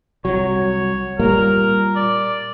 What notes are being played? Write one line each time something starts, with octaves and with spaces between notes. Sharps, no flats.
C2 F#3 C#5
A#2 G3 A#3 A#4
D5